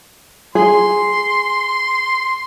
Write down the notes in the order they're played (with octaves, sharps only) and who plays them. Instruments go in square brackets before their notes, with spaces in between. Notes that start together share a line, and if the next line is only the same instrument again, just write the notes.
[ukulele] G#4 [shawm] C6